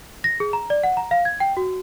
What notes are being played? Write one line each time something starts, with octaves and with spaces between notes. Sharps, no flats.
A#6
G#4
A#5
D5
F#5
A#5
F5
G#6
G5
F#4